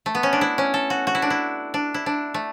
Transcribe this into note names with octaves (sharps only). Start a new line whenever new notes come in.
A3
B3
C#4
D4
E4
C#4
A4
F#4
F#4
E4
D4
E4
D4
E4
D4
A3